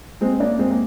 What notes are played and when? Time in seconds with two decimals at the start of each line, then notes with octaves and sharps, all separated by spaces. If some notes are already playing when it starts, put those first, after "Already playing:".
0.21 G#3 C4
0.40 A#3 D4
0.59 G#3 C4
0.70 A#3